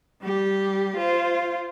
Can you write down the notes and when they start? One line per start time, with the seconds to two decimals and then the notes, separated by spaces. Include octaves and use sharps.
0.22 G3 G4
0.97 F4 C5